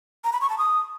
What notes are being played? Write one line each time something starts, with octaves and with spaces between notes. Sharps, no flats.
A#5
B5
C#6
A5
D#6